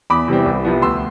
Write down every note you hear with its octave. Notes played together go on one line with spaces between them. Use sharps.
E2 B5 D6
C3 E3 G3 C4
C2
C3 F3 B3
D2 C6 E6